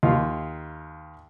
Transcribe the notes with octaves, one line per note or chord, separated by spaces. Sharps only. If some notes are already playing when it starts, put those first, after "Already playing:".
D#2 F4